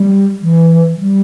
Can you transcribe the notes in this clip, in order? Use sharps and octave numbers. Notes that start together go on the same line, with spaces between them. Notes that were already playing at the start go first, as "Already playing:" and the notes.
Already playing: G3
E3
E3
G3